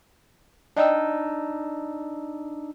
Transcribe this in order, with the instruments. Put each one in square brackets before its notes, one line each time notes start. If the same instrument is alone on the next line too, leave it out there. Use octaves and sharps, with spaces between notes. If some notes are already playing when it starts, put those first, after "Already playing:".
[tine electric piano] D4 D#4 E6 [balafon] D5 D#5 G5